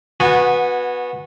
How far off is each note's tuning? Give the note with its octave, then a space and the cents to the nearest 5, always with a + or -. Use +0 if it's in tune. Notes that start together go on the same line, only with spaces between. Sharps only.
B3 -5 F#4 -20 G#5 -15